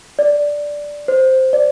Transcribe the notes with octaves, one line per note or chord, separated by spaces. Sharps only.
D5
C5
D5